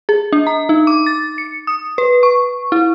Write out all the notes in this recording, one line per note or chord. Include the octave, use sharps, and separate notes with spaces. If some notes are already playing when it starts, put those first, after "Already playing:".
G#4
D4
A#5
D#4
D6
A6
C#7
D#6
B4
C#6
E4